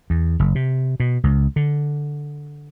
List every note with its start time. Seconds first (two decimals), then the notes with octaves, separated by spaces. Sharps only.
0.10 E2
0.39 F#1
0.55 C3
1.00 B2
1.24 C#2
1.56 D3